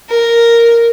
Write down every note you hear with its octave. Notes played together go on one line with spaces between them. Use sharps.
A#4